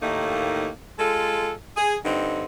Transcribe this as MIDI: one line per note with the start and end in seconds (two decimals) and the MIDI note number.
0.01 0.69 39
0.01 0.69 45
0.01 0.69 57
0.01 0.69 58
0.01 0.69 63
0.99 1.51 56
0.99 1.51 65
0.99 1.51 69
1.77 1.96 68
2.05 2.44 43
2.05 2.44 50
2.05 2.44 60
2.05 2.44 63